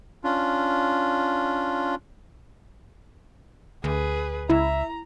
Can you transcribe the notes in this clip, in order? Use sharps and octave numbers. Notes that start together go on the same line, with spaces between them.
C#4 D4 F4
D2 G#4 B4
C#2 E4 E5 A#5